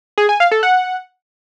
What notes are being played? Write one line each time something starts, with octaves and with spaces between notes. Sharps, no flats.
G#4
G#5
F5
A4
F#5